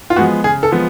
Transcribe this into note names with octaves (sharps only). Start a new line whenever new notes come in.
F4
F3 G#3 B3 F#4
C#3 G#4
A4
F3 G#3 B3